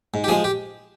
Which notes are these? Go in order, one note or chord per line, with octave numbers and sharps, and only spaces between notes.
G#2
G4
F3 G#3 G#4
G4